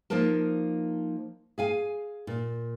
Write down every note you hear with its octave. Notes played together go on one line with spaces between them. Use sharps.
F3 A#3 D#4 A#4 A5
G#4 F5 G#5
A#2